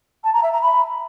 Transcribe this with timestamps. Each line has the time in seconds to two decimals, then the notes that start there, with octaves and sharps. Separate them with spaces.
0.24 A5
0.33 A#5
0.43 E5
0.52 A#5
0.62 B5